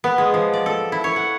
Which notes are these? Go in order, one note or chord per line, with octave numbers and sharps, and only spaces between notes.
B3
G#3
F3
D5
A4
E4
C#5
F#5